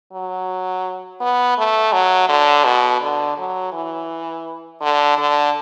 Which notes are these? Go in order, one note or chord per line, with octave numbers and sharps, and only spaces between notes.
F#3
B3
A3
F#3
D3
B2
D3
F#3
E3
D3
D3